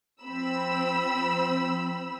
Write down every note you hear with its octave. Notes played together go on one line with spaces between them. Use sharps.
F3 C4 B5 E6